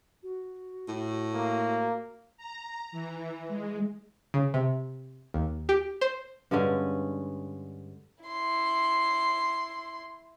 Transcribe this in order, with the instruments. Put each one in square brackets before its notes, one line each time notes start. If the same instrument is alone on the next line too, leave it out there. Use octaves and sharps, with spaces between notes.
[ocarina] F#4
[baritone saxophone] A2
[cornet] A#3
[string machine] A#5
E3
G#3
[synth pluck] C#3
C3
D#2
G4
C5
[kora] G2 D3 G#3 C#4
[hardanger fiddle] E4 C6